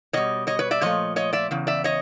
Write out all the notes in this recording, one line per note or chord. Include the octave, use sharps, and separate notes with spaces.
B2 G3 C#5 D#5
C#5 D#5
B4 C#5
D5 E5
A#2 F3 A3 C#5 D#5
C#5 D#5
D5 E5
E2 C#3
D5 E5
C#5 D#5